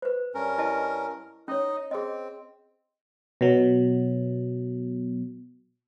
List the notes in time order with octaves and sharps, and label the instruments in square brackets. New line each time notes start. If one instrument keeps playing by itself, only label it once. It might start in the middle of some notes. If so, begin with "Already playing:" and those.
[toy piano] B4 C5
[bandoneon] G2 C#4 A#4
[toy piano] E4 D#5 A5
[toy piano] C#4 C#5 [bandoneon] D#4 D#5
[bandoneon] C4 [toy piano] G#4 D#5
[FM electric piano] B2 F#3